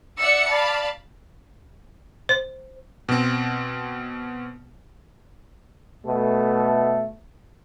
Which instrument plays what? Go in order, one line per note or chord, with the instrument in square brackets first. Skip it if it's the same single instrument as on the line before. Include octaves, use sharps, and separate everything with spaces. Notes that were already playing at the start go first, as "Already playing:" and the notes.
[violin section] D5 E5 F#5 E6 C#7
D5 F5 A5 B5
[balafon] C5
[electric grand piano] B2 C4
[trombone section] B2 A3